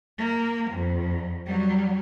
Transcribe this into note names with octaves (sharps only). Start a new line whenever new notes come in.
A#3
F2
F#3 G3